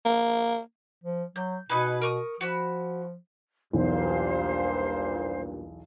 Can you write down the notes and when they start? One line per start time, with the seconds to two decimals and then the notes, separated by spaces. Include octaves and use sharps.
0.05 A#3
1.04 F3
1.36 F#3 G6
1.69 B2 D#4 G#4 B4
2.02 A#4 C#6 D#6
2.41 F3 F#4 B5
3.73 B1 E2 G2 A#2 C5 F5